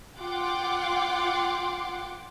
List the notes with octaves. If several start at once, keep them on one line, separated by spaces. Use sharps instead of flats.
F4 F#5 G5 C6 D6